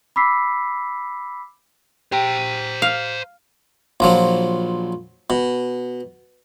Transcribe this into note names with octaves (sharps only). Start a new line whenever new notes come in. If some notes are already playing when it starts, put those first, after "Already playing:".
B5 D6 E6 B6 C7
G4 C5 A#5
F5
A#1 F3 F#3
B2